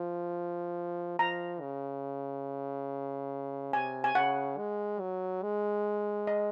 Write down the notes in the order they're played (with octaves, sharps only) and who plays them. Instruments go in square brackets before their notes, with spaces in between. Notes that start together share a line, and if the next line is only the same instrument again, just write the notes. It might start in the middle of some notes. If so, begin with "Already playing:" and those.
Already playing: [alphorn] F3
[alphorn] F3 [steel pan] A#5
[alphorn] C#3
[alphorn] C3 [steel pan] G#5
[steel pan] G#5
[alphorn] C#3 [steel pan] F#5
[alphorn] G#3
F#3
G#3
[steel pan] D#5